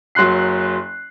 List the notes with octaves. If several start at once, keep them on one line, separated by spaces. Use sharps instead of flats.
F#1 F#3 C6 F#6 C7